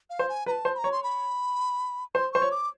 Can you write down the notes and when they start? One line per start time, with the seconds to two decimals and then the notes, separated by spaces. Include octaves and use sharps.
0.10 F5
0.19 C5
0.29 G#5
0.46 B4 A#5
0.51 A5
0.65 C5
0.75 B5
0.78 A#5
0.84 C#5
0.92 C6
1.03 B5
2.15 C5 C6
2.32 C5 C#6
2.42 C#5
2.51 D6